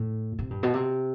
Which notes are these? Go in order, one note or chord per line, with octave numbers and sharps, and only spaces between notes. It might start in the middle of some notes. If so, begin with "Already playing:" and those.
Already playing: A2
C3
G2
B2
C3